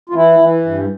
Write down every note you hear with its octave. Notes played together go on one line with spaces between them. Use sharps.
F4
E3 E4
E3
G2